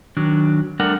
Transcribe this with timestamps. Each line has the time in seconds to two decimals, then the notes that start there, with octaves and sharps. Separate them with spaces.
0.17 D#3 F#3 D4
0.80 G3 A3 D4 A#4 F#5